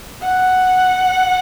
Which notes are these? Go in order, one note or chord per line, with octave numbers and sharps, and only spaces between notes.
F#5